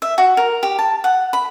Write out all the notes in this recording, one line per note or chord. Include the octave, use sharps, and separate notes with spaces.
E5
F#4
A#4
G4
A5
F#5
B5